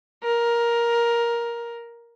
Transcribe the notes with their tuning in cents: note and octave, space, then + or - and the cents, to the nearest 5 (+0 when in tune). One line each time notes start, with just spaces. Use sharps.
A#4 +10